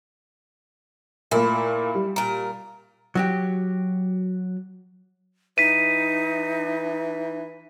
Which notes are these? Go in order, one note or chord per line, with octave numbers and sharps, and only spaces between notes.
A#2 A3 A#3 E4
G3
A#2 A#4
F#3 F#4 G4
E3 D#4 B6 D#7